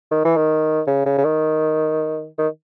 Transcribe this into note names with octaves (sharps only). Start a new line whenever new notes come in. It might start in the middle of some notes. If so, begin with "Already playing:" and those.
D#3
E3
D#3
C#3
C#3
C#3
D#3
D#3